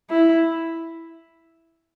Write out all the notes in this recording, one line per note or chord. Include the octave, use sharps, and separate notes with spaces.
E4